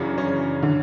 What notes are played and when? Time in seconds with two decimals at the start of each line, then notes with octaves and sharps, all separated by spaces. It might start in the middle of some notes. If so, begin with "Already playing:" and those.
Already playing: F#2 C#3 E3 D4
0.18 C#4
0.63 D3